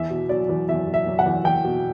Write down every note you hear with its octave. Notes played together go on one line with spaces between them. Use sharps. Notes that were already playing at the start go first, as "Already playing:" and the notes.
Already playing: E2 E5
B2
F#3 D5
E2
E2 E5
B2
E5
F#3
F#5
E2
E2 G5
B2